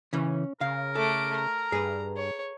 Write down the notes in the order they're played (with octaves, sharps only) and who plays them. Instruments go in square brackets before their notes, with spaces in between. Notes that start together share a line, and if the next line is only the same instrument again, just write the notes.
[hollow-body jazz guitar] C#3 E3 [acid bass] C#4
[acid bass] C#3 [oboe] A#4 [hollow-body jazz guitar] F5
[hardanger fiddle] A3 D6 [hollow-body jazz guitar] A4
[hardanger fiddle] A#5
[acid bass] G2 [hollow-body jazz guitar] G#4 B4
[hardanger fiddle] C#5